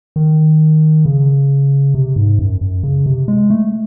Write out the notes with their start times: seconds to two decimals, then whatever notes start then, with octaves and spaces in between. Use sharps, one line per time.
0.16 D#3
1.05 C#3
1.94 C3
2.16 G#2
2.39 F#2
2.61 F#2
2.83 C#3
3.06 C3
3.28 G#3
3.50 A3